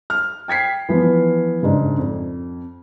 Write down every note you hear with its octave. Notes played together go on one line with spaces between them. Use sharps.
F6
G5 G#6 B6 C7
E3 F3 B3
F#1 G#2 D4
F2